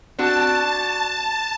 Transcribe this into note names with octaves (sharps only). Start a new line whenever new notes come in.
C4 D4 F#4 A5